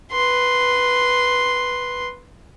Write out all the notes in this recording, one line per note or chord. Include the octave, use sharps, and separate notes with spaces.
B4 C6